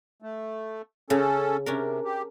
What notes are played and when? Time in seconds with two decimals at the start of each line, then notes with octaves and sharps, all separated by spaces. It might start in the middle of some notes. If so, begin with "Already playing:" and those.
0.22 A3
1.10 C#3 C#4 A4
1.66 C3 C#4 D4 A#4
2.05 G4